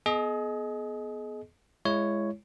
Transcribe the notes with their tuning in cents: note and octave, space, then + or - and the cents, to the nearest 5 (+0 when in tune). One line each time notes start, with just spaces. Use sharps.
B3 +0 G#4 +35 D#5 +0
G#3 +0 E4 +30 C#5 +0